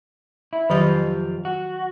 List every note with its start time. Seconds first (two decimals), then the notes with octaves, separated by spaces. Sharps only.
0.53 E4
0.70 F2 D#3 F#3 F4 G4 B5
1.45 F#4